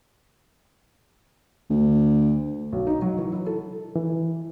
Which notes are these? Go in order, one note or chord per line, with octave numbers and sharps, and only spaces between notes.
D2
B1
D#4
F#3
E3
E4
A4
E3